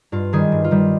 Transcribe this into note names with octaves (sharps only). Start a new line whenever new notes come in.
G2 F4
D#3 G3 G#4
G2
F4
D#3 G3